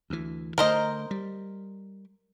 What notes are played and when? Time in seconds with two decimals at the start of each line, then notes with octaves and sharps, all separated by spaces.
0.10 D2 E3
0.58 D3 A3 A#4 C5 D#5
1.11 G3